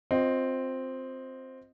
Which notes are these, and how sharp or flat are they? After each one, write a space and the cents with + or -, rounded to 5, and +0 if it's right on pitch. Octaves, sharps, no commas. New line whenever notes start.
C4 +0 F4 +30 D#5 +0